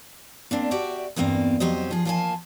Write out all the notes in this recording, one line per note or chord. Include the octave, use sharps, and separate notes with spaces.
A#3 C4 D4
F#4 G4 D5 E5 F#5
E2 G2 A#3 C4
F2 F#3 G4 C5 D#5
F3 G#4
F3 A#3 F4 C#5 G#5 A5